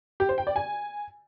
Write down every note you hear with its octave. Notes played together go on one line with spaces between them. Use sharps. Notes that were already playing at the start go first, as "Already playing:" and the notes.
G4
C5
G5
D5
G#5